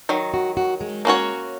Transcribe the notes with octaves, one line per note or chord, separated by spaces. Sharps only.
D#3 F#3
F#4
F#4
G#3
A#3 C#4 F#4 C#5